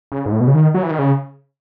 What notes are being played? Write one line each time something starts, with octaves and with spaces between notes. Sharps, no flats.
C#3
G#2
A2
B2
C#3
D#3
F#3
E3
D#3
C#3